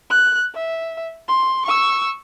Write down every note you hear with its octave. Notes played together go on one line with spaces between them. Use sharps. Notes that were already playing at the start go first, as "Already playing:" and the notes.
F#6
E5
C6
C#6 E6